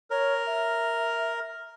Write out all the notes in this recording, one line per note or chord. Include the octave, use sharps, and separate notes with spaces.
A#4 C#5
E5